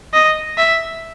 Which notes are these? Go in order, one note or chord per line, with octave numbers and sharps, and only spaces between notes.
D#5
E5